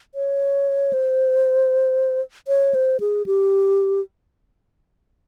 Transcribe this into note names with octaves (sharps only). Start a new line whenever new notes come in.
C#5
C5
C#5
C5
G#4
G4